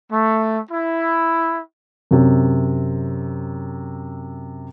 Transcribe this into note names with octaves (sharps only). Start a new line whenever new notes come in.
A3
E4
F#2 C3